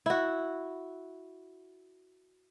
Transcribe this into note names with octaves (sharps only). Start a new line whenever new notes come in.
E4 F#4